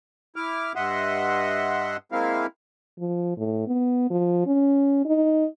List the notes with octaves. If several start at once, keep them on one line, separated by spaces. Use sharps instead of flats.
E4 D6 F6
G2 D#5 E5 F#5 C6
G#3 A#3 C4 E4 F5
F3
A2
B3
F3
C#4
D#4